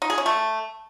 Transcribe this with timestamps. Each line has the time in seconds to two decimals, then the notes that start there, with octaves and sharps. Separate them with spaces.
0.02 D#4
0.10 G#4
0.18 C#4
0.26 A3